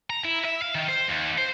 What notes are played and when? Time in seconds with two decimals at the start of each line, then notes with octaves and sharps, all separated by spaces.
0.10 A#5
0.24 E4
0.45 E5
0.62 F5
0.75 D#3
0.89 C5
1.09 D#2
1.38 C5